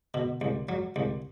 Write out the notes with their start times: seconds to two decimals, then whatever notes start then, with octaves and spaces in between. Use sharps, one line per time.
0.14 B2
0.41 C2
0.69 F#3
0.96 C2